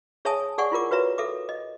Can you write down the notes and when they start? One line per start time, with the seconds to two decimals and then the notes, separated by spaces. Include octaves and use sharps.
0.25 G#4 C#5 E5 G#5 A5 D#6
0.58 G#4 D5 F#5 G#5 C#6
0.72 E4 F4 A#4 D6
0.91 F#4 B4 C#5 E5 A#5
1.18 A4 E5 D6
1.49 D#5